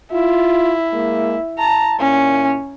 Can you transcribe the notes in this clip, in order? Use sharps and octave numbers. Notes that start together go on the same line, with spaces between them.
E4 F4
G#3 A#3
A5 A#5
A#2 C#4 E4